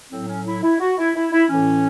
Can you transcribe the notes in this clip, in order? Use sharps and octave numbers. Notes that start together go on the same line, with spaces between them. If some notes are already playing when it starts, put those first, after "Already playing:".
A2 F#3 C4
C#4
E4
E4
F#4
E4
E4
E4
A2 E3 C#4